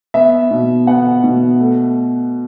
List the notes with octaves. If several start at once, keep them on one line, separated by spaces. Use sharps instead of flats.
B3 E5
B2
B3 F#5
B2
A3